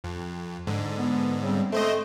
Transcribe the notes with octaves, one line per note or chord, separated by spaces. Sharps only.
F2
G#2 D3
B3
C#3 G3 C4
A3 C4 C5 D#5